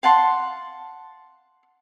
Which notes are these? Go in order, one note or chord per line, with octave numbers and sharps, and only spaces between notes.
F5 F#5 A5 C6